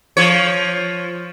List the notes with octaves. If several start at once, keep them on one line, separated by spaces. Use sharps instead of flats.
F3 C#5